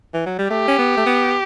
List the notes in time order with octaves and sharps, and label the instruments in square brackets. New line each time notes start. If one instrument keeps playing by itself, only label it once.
[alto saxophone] E3
F#3
G3
[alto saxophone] A3 [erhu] G4
[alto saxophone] C#4
B3
A3
B3